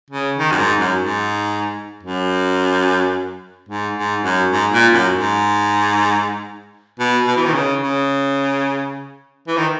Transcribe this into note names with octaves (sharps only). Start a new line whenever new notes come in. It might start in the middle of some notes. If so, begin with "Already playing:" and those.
C#3
D#3
F#2
G#2
F#2
G#2
F#2
G#2
G#2
F#2
G#2
A#2
F#2
G#2
B2
B2
E3
D#3
C#3
C#3
E3
D#3